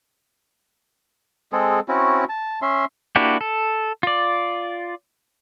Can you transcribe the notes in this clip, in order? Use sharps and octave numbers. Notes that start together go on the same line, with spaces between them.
G#3 C4 G#4 A4
C4 C#4 E4 F#4
A5
C#4 E5 C6
A#3 D4 E4 F#4 G4
A4
F4 D5